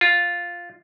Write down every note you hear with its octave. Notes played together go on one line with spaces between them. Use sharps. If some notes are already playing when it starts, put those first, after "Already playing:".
F4